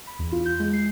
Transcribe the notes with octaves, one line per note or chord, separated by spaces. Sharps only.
B5
E2
F4
G6
G#3
C7